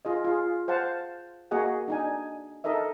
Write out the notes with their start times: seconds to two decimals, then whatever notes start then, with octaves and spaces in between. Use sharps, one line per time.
0.05 F4 G#4 D#5
0.24 F4 G#4
0.68 C5 F5 F#5 A5
1.51 A#3 F#4 G#4 D#5 F#5
1.88 D4 D#4 G#5
2.64 D#4 A4 A#4 D#5 E5